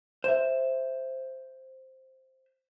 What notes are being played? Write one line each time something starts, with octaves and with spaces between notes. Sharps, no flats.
C5 E5